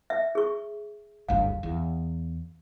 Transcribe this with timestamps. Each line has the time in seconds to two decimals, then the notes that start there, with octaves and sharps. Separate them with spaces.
0.10 E5
0.35 G#4 C#6
1.29 F#1 D2 G2 F5
1.63 E2